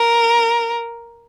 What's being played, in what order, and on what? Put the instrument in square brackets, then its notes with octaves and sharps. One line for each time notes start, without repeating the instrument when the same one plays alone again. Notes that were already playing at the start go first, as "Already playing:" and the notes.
Already playing: [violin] A#4